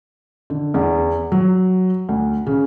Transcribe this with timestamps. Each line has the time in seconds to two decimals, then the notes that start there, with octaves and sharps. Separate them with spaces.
0.50 D3
0.74 E2
1.32 F#3
2.09 D2
2.46 C#3